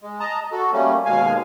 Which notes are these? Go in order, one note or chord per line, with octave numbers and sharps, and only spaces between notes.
G#3
D#5 A5 A#5
F#4 A4
G3 A3 A#3 C#4
D#2 B2 G#3 F5 G#5